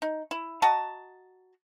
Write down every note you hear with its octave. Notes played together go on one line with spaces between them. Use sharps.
D#4
E4
F#4 D#5 A5 A#5